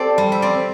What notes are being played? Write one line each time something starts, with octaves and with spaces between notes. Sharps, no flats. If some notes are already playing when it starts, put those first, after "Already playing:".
Already playing: C4 G4 A4 C5 D5
G3
E5
C4 D5